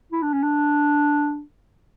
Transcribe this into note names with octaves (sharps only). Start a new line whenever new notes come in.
E4
D4
C#4
D4